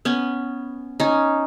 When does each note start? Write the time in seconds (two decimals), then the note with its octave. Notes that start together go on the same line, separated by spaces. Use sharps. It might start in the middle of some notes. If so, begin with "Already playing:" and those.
0.05 B3 C#4
1.00 C#4 D#4